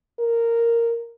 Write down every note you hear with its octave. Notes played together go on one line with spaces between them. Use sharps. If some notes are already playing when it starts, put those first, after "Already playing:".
A#4